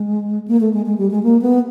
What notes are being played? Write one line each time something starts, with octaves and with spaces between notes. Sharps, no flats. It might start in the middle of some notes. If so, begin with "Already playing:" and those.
Already playing: G#3
A#3
A3
G#3
G#3
G3
G#3
A#3
B3